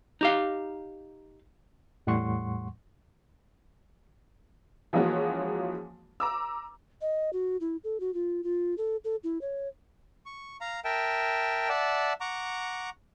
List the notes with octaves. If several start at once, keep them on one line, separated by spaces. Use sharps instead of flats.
D#4 G4 F5
E2 A2 G3 F#5 C6 C#6
E3 F3 G#3 A#3 C#4 F#4
A#5 D6 E6
D#5
F#4
E4
A4
F#4
F4
F4
A4
A4
E4
C#5
C#6
F5 A#5
A#4 E5 G5 A5
D5 E5 F#5 A5
F#5 A#5 C#6 D6